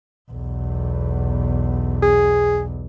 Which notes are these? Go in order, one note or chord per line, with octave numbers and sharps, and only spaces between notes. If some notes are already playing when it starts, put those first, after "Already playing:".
B1 E2
G#4